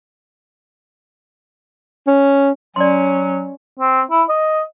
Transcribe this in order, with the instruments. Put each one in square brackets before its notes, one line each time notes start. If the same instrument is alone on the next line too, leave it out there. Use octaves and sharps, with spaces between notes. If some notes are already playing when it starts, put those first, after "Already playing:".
[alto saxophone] C#4
[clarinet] F#3 [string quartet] C#4 [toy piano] D5 C6
[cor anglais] C4
E4
D#5